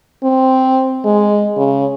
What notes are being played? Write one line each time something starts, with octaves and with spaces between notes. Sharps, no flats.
C4
G#3
C#3